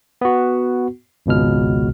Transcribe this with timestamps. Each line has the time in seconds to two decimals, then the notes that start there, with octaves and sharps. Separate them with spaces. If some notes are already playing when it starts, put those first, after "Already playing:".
0.21 B3 F#4
1.26 G#1 C#2 B2 F6